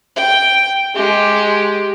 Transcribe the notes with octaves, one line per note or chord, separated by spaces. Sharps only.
G5
G#3 G4